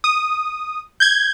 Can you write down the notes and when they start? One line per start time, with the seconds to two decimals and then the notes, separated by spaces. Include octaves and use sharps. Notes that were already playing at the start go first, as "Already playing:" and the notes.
0.04 D#6
1.00 G6 G#6